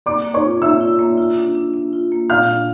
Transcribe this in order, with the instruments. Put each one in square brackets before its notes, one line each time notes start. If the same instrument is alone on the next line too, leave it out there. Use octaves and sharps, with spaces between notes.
[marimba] A#3 [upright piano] D5 D6
[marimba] A#3
[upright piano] C#5 C#6
[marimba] F4
[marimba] A#3 [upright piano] E5 E6
[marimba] F4
A#3
F4
D4
D4
D4
F4
A#3
[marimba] A#2 [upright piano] F5 F6
[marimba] D4